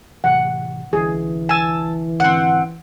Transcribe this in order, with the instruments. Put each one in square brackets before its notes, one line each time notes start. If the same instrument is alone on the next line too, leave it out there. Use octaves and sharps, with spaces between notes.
[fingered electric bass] A2 C3 E3 [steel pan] F#5
[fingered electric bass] C2 D3 [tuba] E3 [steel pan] G#4
[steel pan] G#5 [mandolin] A5 E6
[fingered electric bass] G#1 D3 [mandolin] C4 F#5